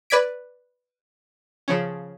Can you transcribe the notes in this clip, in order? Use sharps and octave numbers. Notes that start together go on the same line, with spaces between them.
B4 D5 G#6 B6 D7
C#3 F3 C#4